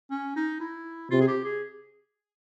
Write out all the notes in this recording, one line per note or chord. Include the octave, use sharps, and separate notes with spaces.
C#4
D#4
E4
C3 F4
G#4
G4
G#4